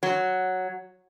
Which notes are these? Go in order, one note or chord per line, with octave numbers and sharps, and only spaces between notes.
F#3